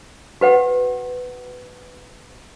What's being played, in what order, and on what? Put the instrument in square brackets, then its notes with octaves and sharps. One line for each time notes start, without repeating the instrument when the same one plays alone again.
[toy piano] F#4 B4 F#5